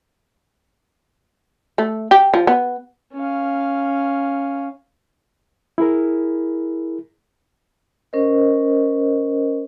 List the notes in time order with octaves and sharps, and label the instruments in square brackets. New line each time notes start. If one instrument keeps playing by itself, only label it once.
[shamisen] A3
G4
F3
B3
[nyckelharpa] C#4 F5
[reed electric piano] E4 G#4 A#4
[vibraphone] C#4 A#4 C5 D#5